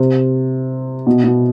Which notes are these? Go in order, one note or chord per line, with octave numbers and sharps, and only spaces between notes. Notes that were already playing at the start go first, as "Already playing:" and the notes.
Already playing: C3
B2
B2